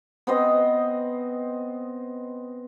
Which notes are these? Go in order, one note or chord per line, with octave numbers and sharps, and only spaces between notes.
B3 C4 C5 D#5